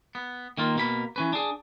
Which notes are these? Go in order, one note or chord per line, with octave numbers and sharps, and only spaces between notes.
B3
D#3 A#3 F4
B2 A#3 B5
E3 C#4 B4
D4 G#4